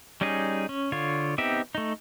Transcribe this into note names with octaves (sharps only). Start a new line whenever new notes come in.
G3 C#4 D#4 G#4
C#4
D3 F4 C#5
B3 C4 D#4 G4 E5
A3 D#4